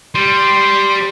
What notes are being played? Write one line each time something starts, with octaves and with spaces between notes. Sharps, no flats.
G3 C6